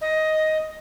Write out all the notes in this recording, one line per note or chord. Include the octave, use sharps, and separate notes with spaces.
D#5